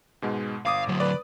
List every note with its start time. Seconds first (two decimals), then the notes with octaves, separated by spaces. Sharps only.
0.22 G#2 B2 G#3
0.66 G1 F5 D6 D#6
0.88 D3 F#3
1.00 B4 D5